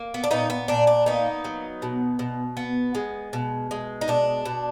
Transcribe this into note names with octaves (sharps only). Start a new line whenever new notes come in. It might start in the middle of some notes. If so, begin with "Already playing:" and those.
Already playing: A#3
B3
D4
A#2 B3 D#4
B3
A#2 D4
D4
A#3 B3 D#4
F#3
B2
B2
B3
G#3
B2
G#3
D#4
B2 D4
B2